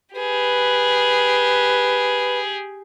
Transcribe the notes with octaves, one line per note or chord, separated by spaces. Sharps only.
G4 G#4 B4